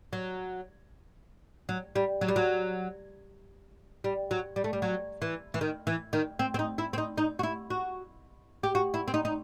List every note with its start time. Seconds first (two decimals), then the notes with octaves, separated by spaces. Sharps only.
0.13 F#3
1.69 F#3
1.96 G3
2.21 F#3
2.28 G3
2.36 F#3
4.04 G3
4.31 F#3
4.56 G3
4.64 A3
4.73 G3
4.82 F#3
5.22 E3
5.54 E3
5.61 D#3
5.87 E3
6.13 D#3
6.39 C4
6.54 C4
6.59 D#4
6.78 E4
6.93 C4
6.98 D#4
7.18 D#4
7.39 F#4
7.43 E4
7.70 F#4
8.63 G4
8.75 F#4
8.94 E4
9.08 C4
9.14 D#4
9.25 D#4